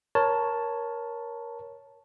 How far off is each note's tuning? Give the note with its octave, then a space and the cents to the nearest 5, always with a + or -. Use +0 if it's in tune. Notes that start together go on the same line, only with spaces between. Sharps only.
A#4 +15 C#5 +0 A5 +0